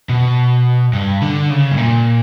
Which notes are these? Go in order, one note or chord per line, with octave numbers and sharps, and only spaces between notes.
B2
G2
D3
C#3
G2
A#2